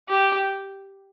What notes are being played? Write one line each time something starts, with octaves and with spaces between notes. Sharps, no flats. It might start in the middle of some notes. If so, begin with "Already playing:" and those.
G4